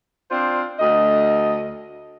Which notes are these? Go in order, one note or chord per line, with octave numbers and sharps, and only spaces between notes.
C4 D4 F4 C5 D5
D2 D#5